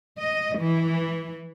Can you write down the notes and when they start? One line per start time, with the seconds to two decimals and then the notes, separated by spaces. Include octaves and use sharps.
0.18 D#5
0.59 E3